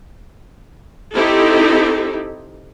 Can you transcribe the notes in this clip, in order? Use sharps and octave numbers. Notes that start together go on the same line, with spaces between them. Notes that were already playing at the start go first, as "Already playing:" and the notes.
C4 D#4 E4 G4 A4